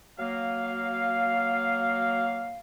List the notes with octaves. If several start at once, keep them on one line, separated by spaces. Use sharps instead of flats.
F#3 A#3 F5